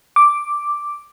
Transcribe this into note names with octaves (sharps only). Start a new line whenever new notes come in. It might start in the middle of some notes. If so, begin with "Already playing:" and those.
D6